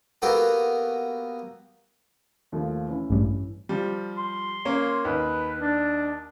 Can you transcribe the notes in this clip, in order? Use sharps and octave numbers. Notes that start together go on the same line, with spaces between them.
A#3 B3 F#4 G4 A4
D#2 F3 A3
E3 C#4 E4
A1 G2
F3 G3
C6
A#3 C#4
D#2 B4
D4